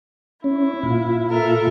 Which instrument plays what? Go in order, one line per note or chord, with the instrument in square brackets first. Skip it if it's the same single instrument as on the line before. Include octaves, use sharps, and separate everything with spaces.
[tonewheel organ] C#4 [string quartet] E4
[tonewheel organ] A#2 F4
[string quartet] A4 A#4 E5